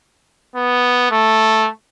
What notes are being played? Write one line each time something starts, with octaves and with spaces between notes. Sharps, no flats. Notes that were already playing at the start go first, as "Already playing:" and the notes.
B3
A3